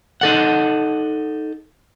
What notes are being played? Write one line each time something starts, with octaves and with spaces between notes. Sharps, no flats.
D#4 A4 F#5